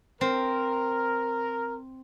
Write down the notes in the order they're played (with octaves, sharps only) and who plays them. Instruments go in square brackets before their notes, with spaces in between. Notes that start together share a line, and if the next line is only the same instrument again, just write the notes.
[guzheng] C4 [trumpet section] A#4